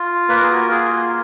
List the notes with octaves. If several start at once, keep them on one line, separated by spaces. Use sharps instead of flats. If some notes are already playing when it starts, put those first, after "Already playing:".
Already playing: F4
A#3 B4
A#4
G#4
F#4 A#4
F4 G#4